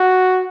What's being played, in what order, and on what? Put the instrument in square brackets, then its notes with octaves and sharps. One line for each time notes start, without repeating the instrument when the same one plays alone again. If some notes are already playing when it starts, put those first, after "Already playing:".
Already playing: [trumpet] F#4